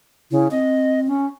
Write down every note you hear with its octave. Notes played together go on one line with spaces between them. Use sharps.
C#3 E4
C4 D#5
C#4